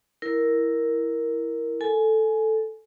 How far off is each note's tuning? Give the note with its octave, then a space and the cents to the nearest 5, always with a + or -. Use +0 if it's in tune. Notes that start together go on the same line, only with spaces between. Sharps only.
E4 +0 A#4 +0
A4 +0 G#5 +20